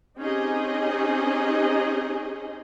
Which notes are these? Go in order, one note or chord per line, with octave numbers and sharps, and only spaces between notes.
C4 C#4 D#4 G4 G#4 D#5